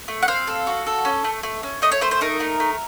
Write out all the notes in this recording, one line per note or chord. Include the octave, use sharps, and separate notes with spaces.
A3
F#5
C4 F5
A4
F#4
A4
C#4
A3
A3
C#4
A3 D#5
C#5
A3 C5
C5
D#4 A#4
A3
A3